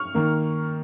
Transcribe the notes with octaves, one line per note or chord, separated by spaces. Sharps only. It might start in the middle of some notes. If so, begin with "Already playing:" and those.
Already playing: C#6 F6
D#3 A#3